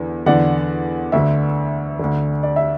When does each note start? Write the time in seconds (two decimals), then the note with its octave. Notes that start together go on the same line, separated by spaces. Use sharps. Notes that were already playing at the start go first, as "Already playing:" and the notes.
Already playing: E2 D3
0.26 E2 D3 D5 F#5
1.12 D2 D3 E5
1.99 D2 D3
2.43 D5
2.56 E5